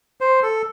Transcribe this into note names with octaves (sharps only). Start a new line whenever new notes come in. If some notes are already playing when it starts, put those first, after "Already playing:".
C5
A4